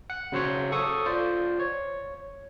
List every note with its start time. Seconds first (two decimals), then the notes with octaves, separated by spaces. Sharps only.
0.10 F#5
0.32 C#3 F#3 C5 C#5 F#5 C6
0.72 A4 C#6 D#6
1.06 F4 C5 D5
1.60 C#5